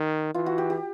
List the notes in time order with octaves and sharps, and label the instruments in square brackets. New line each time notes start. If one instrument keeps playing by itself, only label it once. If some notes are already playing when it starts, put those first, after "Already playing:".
Already playing: [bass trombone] D#3
[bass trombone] E3 [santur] F4
[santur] F#4
G4
G4